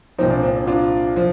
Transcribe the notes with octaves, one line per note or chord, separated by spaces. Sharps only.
C2 A#2 F3 C4 D#4
D4
C4
D4
D4 F4
F3